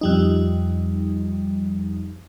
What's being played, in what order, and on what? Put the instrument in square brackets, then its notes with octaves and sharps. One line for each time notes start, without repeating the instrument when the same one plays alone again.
[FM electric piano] F2 G3 D#4